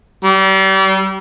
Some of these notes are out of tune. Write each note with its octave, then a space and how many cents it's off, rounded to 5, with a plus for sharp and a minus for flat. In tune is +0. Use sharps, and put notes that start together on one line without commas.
G3 -35